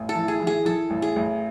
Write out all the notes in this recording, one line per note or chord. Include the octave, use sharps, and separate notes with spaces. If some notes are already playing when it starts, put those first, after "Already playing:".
Already playing: A1
A4
E3
G#4
E3
G#4
E3 A4
A1
G#4
A1